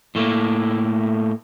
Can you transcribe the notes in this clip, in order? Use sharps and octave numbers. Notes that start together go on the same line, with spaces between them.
A2 A3 A#3